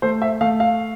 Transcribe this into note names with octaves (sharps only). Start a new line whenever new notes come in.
A3 C5
E5
A3 F5
F5